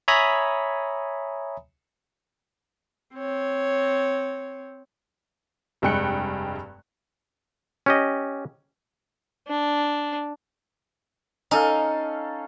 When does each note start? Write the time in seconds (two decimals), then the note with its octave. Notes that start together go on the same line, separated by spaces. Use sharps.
0.08 C#5 E5 G#5 A#5 B5 D#6
3.15 C4 C#5
5.82 F1 G2 G#3 G5 F#6 C#7
7.86 C#4 G4 D#5
9.48 D4
11.51 C#4 D#4 A4 F5